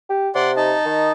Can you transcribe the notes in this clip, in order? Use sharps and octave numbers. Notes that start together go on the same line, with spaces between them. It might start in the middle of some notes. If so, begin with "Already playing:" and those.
G4
C3 D5 F#5 C6
D#4 D#5 A5
D#3